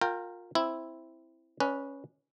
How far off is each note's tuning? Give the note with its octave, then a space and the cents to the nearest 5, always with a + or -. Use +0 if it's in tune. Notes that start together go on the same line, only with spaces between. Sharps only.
F4 +25 A#4 -15 G5 +5
C4 +0 E4 +0
C#4 +0 B4 -15 D5 +35